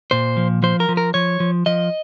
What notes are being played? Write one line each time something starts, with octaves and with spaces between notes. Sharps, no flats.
A#2 C5
F3
F3 C5
A#4
F3
A#4
F3 C#5
F3
F3 D#5